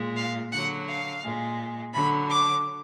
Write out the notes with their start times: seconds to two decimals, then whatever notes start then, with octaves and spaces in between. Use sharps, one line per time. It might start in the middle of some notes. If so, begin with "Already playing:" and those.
Already playing: A#2 G#3
0.16 F5
0.51 D3 F#3 F#5
0.88 F5
1.23 A#2 G#3
1.93 D3 F#3 B5
2.29 D6